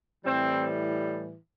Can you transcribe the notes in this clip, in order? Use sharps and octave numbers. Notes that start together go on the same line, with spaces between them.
A2 E3 G3 C4